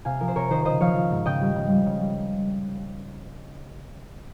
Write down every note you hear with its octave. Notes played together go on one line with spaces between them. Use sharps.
C3 F5 G#5
F3 A#4
C5
C3 A#4 C#5
D#3 C5 D#5
C#3 C5 D#5
F3 C#5 F5
F3
G#2
C#3 D#5 G5
G3
C#3
G3
C#3
G3